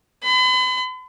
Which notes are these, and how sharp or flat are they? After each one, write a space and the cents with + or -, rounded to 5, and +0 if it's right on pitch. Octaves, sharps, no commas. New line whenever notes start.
B5 +40